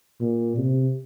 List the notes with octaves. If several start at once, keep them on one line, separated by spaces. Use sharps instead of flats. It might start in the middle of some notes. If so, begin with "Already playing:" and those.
A#2
C3